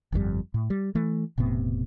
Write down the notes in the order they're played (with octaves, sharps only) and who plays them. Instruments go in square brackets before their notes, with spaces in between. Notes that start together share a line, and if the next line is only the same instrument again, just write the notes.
[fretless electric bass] G1 F2 D3 G3
A2
G3
E3 A3
E1 A2 C3 B3